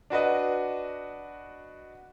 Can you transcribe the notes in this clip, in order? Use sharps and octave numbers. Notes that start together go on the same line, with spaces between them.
D4 F#4 B4 D#5